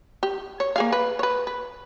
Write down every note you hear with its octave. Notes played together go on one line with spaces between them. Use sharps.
G4
C#5
A#3 G#4 F5
B4
B4 C#5
B4